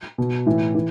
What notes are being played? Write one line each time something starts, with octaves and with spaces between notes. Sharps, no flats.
B2
A2 E3
E3